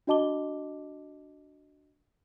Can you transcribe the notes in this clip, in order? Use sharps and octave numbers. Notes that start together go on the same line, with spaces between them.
D4 F#4 D#5 A5 D6 G7